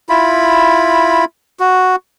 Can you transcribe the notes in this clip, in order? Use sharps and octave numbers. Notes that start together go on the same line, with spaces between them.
E4 F4 B5
F#4